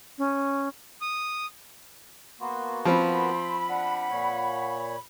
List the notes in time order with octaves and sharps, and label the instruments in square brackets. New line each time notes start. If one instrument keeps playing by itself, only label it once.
[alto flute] C#4
[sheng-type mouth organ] D#6
[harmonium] A#3 B3 F#4 [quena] C6
[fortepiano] F3 C4 [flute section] B5 [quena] C6
[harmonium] D4 [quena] F#5
[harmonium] A#2 C#5